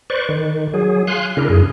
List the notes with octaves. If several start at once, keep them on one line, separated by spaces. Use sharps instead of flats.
B4 C5 D5 C#6
D#3
F#3 G#4
F5 G#5 C6 F#6
C#3 D4 E4 A#4
F#2 G#4